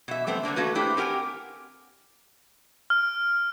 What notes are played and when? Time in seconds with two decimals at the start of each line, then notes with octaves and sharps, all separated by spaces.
0.08 B2 E5
0.27 G3 A3 B3 C4
0.43 D3 A3 A#3 D4
0.56 A3 A#3 F#4 B4
0.75 A3 A#3 C4 D4 E4 G4
0.97 C4 G4 A#4 F#5 G#5
2.90 F6